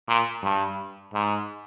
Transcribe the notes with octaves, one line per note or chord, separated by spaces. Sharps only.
A#2
G2
G#2